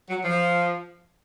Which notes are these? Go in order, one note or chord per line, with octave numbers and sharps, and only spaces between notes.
F#3
F3